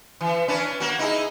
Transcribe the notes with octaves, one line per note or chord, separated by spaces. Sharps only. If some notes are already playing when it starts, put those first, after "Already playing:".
E3
C#4 D4 B4
A#3 F#4
D#4 E4 G#4